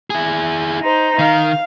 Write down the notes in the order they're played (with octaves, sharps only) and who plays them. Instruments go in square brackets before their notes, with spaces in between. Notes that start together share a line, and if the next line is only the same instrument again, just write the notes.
[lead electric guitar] E4 G#4
[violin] D#4 C5
[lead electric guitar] D#3 [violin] F5